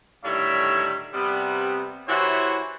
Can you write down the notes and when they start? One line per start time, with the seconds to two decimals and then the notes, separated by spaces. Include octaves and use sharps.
0.24 A2 D3 D#3 G3 C#5 E5
1.14 C3 G3 B3
2.08 E3 E4 F#4 G4 C5 C#5